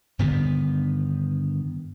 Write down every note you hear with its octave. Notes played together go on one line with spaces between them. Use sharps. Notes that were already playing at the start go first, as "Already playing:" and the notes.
G2 D3 D#3 B3